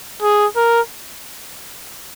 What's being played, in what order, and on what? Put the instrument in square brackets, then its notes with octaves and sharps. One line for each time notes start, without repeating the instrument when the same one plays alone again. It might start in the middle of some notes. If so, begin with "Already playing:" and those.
[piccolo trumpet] G#4
A#4